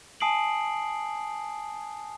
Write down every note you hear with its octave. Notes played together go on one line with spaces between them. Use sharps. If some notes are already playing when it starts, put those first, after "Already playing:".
G#5 A5 D#6 C7 D7 F#7